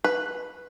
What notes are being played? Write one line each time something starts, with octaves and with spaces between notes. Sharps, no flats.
B4